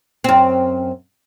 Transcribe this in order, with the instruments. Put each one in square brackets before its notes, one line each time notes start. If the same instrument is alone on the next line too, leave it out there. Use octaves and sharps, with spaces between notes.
[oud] F#2 C4